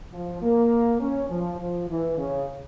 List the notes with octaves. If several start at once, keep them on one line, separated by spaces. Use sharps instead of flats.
F3
A#3
C#4
F3
F3
E3
C#3